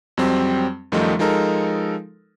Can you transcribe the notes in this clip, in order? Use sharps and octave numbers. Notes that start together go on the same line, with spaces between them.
F2 F#3 G3 C4
F#2 D#3 F3 G3 A3 D#4
F3 G#3 D#4 A4 A#4